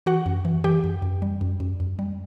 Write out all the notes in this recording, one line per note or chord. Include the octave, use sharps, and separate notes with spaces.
E3 F#4 F#5
F#2
E3
E3 G4 G5
F#2
F#2
G3
F#2
F#2
F#2
G3